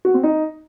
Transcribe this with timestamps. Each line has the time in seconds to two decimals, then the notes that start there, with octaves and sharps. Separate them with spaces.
0.05 F#4
0.14 C4
0.23 D#4